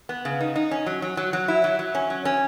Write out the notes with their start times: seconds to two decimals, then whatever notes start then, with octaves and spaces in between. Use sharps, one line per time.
0.09 B3
0.25 C#3
0.40 D#4
0.56 D#4
0.71 C#4
0.86 F#3
1.02 F#3
1.17 F#3
1.33 F#3
1.48 E4
1.64 F#3
1.79 F#3
1.95 C#4
2.10 F#3
2.25 C#4